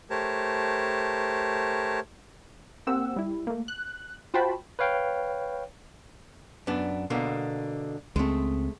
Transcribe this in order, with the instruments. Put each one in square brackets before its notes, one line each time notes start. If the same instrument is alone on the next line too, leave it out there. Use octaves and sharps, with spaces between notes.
[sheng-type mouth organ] A3 G4 A#4 C5 C#5 A5
[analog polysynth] A#3 C4 G4 F#5 E6
G3 E4
A3 A#3
F#6
F4 F#4 C5 G5 A5 B5
[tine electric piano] B4 C#5 F5 G5
[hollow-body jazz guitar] F#2 B3 D4
B2 D3 A#3
[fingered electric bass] C#2 C4 [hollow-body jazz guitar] G#3 A3